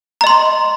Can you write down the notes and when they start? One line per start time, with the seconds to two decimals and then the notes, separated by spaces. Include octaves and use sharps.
0.21 A#5
0.24 D#5
0.27 C6